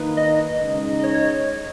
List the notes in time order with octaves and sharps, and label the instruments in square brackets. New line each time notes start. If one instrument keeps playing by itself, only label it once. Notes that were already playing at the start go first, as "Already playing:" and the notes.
Already playing: [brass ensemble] D#3 A#3 D#4 [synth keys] B4
[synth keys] D#5
[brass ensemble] C#3 G#3 D#4
[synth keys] D#5
C#5
C#5